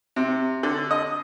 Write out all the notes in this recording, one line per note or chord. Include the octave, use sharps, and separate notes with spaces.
C3
D3
D#5